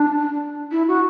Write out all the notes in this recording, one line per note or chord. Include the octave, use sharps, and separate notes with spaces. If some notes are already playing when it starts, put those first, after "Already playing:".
Already playing: D4
E4
F#4